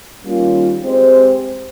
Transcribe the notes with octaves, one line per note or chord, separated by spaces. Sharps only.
D#3 G3 A#3 C#4 F4
G#3 C4 G4 C5